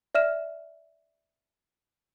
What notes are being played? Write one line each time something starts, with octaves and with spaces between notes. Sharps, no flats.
D5 E5 F6 E7